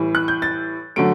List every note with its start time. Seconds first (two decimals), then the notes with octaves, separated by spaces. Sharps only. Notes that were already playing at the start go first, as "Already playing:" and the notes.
Already playing: A2 E3 G3
0.15 F#6
0.28 G6
0.42 A6
0.96 D3 F#3 A3 D7